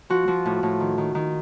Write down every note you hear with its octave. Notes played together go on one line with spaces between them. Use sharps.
F3 F#4
F3
A2
A2
D#3
D#3
D#3